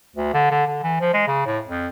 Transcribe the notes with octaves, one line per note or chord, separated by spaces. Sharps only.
D2
D3
D3
D3
E3
F3
G#3
C#3
A2
F2